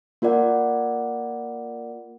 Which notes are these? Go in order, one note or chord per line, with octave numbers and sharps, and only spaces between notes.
A#3 F4 A#4 D5 F#5